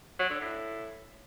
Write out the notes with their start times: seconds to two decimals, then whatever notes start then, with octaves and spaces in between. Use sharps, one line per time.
0.19 F#3
0.30 D3
0.40 A2